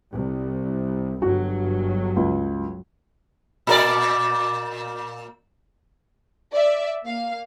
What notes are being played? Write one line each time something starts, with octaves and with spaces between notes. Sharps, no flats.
C2
G1 F#3 F#4
C#2
A#2 A#4 D5
D5 E5
A#3 F5